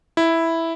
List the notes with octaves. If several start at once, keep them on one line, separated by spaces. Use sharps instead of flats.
E4